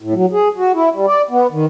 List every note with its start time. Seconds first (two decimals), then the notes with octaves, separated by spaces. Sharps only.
0.02 A2
0.14 F#3
0.33 G#4
0.58 F#4
0.75 E4
0.93 G3
1.07 D5
1.31 B3
1.52 D#3